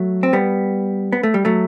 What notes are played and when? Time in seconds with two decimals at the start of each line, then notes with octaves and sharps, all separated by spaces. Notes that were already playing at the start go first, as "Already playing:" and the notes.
Already playing: F#3 A3
0.23 C4
0.33 G3 B3
1.12 B3
1.23 A3
1.34 G3
1.45 F#3 A3